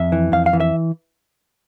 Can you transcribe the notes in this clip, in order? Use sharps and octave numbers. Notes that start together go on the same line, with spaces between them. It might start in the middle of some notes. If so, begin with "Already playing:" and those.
Already playing: F2 E5
E3
F2 F5
F5
E3
E5